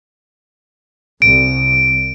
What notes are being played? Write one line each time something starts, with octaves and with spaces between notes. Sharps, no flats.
C2 D7